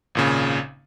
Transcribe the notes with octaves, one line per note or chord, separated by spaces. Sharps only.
G#1 A#2 C#3